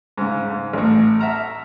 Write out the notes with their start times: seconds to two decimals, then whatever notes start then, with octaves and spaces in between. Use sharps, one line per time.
0.18 G#2 C#3
0.50 G#2
0.74 A1 A2
1.20 E5 F#5 A5 A#5 F6